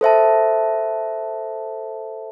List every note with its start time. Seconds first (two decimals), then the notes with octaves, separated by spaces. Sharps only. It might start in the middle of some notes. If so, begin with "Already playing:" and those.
0.01 A4 C5 E5 A5